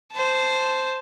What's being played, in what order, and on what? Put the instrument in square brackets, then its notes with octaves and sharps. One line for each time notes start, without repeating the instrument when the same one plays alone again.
[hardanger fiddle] C5 A5